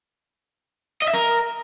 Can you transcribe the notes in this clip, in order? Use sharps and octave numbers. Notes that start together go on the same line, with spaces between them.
D#5
E5
A#4